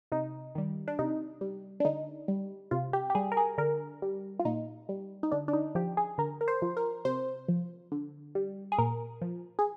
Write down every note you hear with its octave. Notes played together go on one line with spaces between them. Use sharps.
C3 D#4
D#3 G3
D4
C3 D#4
G3
D4
D3 D#4
G3
C3 F4
G4
G4
G3 G#4
A#4
G#4
D3 A#4
G3
F4
A#2 D#4
G3
D#4
D3 D4
D4
D#4
F3 G4
G#4
D3 A#4
A#4
C5
F3
A#4
C3 C5
F3
D3
G3
G#4
A#2 A#4
F3
G#4